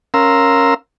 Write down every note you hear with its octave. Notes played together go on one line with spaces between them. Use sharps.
C#4 A#4 F5 A#5 C6 E6